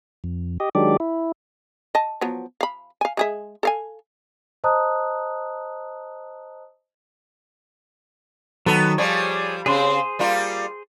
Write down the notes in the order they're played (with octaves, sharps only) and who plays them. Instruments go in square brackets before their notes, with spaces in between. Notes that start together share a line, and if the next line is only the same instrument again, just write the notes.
[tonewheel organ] F2
G4 D#5
D#3 F#3 G#3 D4 G4 D5
E4
[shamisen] D#5 A5
F3 F#3 B3
F5 B5
F5 G#5
G#3 G#4 E5
A4 F5 G#5
[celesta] C5 D#5 A5 A#5 D#6 F#6
[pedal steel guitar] D#3 F#3 [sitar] B3 A4
[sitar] F3 G3 [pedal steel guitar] G#4 C#5
[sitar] C#3 C4 [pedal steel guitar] G#4 C5 C6
[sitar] G3 A#3 F4